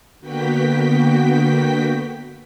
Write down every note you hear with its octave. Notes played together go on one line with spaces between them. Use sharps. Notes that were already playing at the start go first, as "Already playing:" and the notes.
D3 A#3 B3 F#4 G5 B6